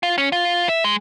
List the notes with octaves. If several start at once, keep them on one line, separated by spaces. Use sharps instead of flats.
F4
C#4
F4
E5
G#3